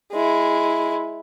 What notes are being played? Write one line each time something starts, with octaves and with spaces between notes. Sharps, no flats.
G#3 E4